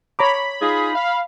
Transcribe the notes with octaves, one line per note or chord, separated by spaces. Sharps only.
C#5 A#5 B5 D6
D#4 F4 G#4
F5